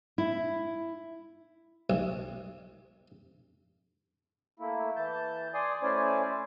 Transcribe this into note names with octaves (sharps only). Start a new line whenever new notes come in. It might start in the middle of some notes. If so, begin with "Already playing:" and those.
E4
B1
A3 A#3 E4
E3 A5 G6
D5 G#5 C6 D#6
A3 C#4 E4 C5 D5 G#5